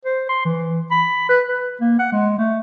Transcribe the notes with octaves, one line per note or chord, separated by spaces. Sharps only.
C5
C6
E3
B5
B4
B4
A#3
F#5
G#3
A3